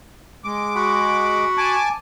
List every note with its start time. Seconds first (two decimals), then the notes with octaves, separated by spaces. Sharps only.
0.44 G#3 D6
0.75 F#4 F#5 B5
1.58 G#5 A5 D6